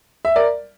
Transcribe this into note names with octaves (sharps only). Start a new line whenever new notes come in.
E5
A#4 D5